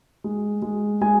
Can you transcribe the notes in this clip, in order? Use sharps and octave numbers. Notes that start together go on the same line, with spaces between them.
G#3
G#3
G#3 G#5